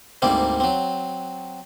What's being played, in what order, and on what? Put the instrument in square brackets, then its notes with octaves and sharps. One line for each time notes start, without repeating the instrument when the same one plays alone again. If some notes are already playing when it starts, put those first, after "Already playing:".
[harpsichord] D2 G#2 G3 A#3 C4
F#3 C4